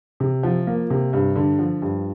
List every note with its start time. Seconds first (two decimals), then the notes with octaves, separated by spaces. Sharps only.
0.20 C3
0.43 F3
0.67 A#3
0.90 C3
1.13 G2
1.36 D3
1.59 F3
1.82 G2